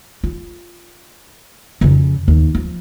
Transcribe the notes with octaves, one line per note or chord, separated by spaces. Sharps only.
F4
F2 C#3
D#2
F3